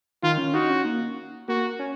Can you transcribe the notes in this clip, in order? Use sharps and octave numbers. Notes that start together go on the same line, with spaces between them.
D#3 F4
C#4
D#4 F#4
C#4
A#3
A#3 F#4
C#4